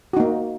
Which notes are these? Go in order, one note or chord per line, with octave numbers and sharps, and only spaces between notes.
A#3 D#4 F#4